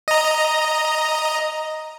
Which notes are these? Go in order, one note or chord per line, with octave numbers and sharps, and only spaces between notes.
D#5 A#5